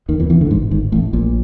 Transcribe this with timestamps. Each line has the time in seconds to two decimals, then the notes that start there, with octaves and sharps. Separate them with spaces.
0.09 D#2 D#3
0.20 E2 E3
0.30 E2 E3
0.41 D2 D3
0.51 G#1 G#2
0.71 G#1 G#2
0.92 A1 A2
1.13 A#1 A#2